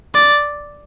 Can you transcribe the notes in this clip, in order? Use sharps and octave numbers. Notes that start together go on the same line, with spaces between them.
D5